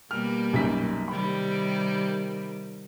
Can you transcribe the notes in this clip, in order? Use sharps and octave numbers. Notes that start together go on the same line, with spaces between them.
B2 G3 A#3 F6
B1 F#2 B6
C3 D#3 G3 B5